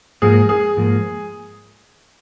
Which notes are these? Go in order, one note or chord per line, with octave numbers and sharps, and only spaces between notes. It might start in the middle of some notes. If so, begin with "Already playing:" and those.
G#2 F3 A#3 G#4
G#4
G#2 F3 A#3